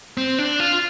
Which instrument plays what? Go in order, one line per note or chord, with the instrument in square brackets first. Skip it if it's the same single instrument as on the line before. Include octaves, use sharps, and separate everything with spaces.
[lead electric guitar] C4
D4
F4